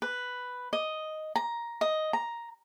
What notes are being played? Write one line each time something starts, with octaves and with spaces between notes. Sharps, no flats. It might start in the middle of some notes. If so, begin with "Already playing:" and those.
B4
D#5
A#5
D#5
A#5